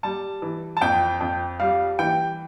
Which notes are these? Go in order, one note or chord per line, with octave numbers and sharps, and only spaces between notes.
G3 A5
E3
A5
F2 G5
F2
G3 F5
E3 G5